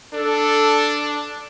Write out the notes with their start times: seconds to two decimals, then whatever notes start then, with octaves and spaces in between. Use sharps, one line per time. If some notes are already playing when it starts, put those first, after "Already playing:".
0.14 D4 A4